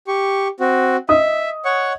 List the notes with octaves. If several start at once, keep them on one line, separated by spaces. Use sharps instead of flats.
G4 C#6
C4 F#4
D#5 E5 D#6
C#5 F#5 C#6